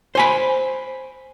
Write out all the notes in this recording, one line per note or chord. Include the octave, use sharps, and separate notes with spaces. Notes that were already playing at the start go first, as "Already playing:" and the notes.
C5 G#5 B5